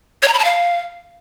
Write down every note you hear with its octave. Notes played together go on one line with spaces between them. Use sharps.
C#5
A#5
B5
A5
F5